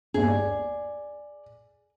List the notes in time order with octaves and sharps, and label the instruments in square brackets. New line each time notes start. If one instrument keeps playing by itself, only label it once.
[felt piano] G1 D#2 [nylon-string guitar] G#4
[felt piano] D5